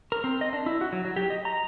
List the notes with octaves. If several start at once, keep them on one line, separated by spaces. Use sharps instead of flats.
A#4
C4
D#5
D4
E4
F#4
F#3
F#3
G4
D#5
A#5